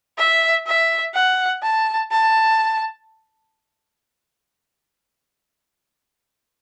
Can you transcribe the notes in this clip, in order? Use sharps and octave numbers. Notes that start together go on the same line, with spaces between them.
E5
E5
F#5
A5
A5